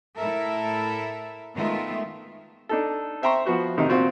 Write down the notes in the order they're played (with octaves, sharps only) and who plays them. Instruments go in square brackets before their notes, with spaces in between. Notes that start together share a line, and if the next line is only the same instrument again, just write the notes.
[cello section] A2 E4 A4 A#4 E5
D#3 G#3 A3 B3 F4 E5
[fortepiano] D4 D#4 A4
C5 E5 G5 A#5 C6 C#6
F3 B3 F#4 C5
A1 C3 D#3 D#4
A#2 C4 F4 F#4